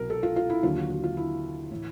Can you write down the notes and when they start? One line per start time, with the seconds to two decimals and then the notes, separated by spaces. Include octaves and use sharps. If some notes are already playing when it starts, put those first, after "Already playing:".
Already playing: C2 B2 F#3 A#4
0.10 A4
0.23 F4
0.36 F4
0.50 E4
0.63 D#2 D3 F#3 F4
0.76 F#4
0.90 F#4
1.04 F4
1.17 E4
1.71 A2 E3